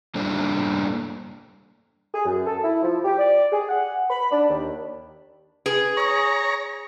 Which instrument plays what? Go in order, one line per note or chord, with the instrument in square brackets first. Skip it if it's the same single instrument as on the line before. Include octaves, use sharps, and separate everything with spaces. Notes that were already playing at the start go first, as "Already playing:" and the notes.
[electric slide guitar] G3 A#3 D4 A4 C5 D5
[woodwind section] G#4
F#2
A4
E4
F3
G4
D5
G#4
F#5
B5
D4
D#2
[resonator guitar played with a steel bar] G#4 [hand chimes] B4
[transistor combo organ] C#5 A#5 [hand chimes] C#6 D#6